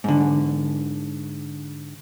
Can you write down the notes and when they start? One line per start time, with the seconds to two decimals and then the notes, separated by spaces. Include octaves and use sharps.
0.04 G#2 D3